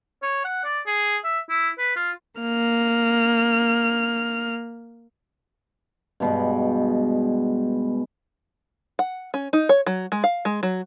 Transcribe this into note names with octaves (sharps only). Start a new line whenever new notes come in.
C#5
F#5
D5
G#4
E5
E4
B4
F4
A#3 F6
G2 B2 G#3
F#5
C#4
D#4
C#5
F#3
G#3
F5
G#3
F#3